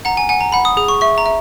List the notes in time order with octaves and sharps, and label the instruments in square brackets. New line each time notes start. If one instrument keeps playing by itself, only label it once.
[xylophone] F#5 A#5
G#5
F#5 G#5
A#5
F#5 B5
D#6
G#4 D#6
C#6
E5 C#6
A#5
E5